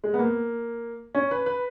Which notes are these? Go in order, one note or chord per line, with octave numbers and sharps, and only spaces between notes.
G#3
B3
A#3
C#4
B4
B4